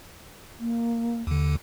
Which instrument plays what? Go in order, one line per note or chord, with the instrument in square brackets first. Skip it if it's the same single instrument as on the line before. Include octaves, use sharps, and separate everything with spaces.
[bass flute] A#3
[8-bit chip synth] D#2 D3